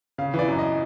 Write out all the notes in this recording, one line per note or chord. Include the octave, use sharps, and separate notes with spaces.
C#3 F5
E3
D5
F#2
D#5